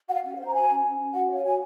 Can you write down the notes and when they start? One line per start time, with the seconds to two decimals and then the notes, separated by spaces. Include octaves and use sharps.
0.08 F#4 F5 F#5
0.24 C#4
0.34 F#5
0.38 C5
0.46 A#5
0.54 F#4 G#5
0.69 C#4
0.84 C#4
0.99 C#4
1.13 F#4 F#5
1.29 C#5 F5
1.44 F#4 G#5